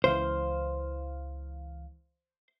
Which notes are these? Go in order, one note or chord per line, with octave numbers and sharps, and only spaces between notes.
C#2 E3 C5 F5